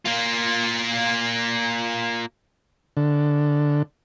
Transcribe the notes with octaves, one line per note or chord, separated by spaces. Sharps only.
A#3 F4
D3